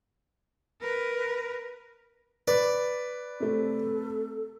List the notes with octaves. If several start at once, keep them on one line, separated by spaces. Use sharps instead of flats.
A#4 B4
B4 D5
C3 A3 A4